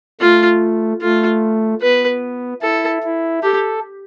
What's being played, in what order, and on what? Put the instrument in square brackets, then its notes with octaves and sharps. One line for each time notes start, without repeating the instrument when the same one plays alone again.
[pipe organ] A3 [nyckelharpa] F4
[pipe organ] A3 [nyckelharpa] F4
[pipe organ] B3 [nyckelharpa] B4
[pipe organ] E4 [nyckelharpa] A4
[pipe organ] E4
[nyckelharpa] G4 [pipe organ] A4